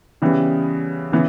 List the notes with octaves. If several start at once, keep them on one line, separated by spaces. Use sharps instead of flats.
C#3 E3 G3 B3
C#3 E3 B3